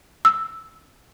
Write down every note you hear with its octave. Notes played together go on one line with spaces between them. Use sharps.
E6